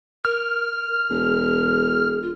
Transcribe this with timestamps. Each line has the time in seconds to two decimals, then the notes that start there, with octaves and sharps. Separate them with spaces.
0.25 A#4 F6
1.10 E1 G#4
2.22 F4